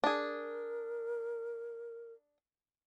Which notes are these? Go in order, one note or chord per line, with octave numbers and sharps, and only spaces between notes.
D4 G#4 A#4